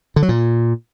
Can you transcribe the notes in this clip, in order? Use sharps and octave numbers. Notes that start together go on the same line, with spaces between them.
D3
F#3
A#2